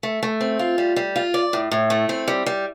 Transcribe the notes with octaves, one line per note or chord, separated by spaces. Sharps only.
A3
A3
C4
F4
G3
G3
F4
D5
A2
A2
A3
C4
G3
G3